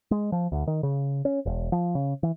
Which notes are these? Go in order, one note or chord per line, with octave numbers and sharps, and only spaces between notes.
G#3
F3
D2
D#3
C#3
C#4
E1
F3
C#3
E3